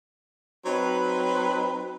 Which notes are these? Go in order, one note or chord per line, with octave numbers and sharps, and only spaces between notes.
F#3 C4 D#4 B4